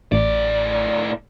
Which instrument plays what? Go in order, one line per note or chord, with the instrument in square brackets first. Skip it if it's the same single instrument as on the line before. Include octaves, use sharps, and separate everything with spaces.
[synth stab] A1 [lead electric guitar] A2 D5